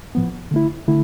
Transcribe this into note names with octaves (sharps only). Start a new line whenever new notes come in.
A2 F3 B3
D3 A3 E4
D3 A3 E4